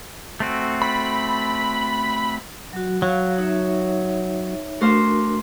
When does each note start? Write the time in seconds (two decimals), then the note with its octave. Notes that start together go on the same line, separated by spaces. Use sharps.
0.40 A3 C4 F#4
0.82 B5
2.73 F#3 F#4
3.02 F#3 F5
3.38 D#4 C#5 E5
4.81 A3 D4 F#4 A#4 C5 F5